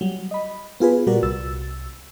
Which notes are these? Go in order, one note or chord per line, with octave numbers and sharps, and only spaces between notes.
F#3 G3
D#5 B5
B3 F4 G#4 B4
A#2 G3 F#4 A#4 D5
C2 E6 A6